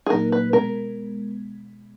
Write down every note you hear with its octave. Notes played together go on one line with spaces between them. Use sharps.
G#4
A#2 F#3 A#3 D#4 A#4
B4
B2 G#3 B3 A#4